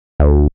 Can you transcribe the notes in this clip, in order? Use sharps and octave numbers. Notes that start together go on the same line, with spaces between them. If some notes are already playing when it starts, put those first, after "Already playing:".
D2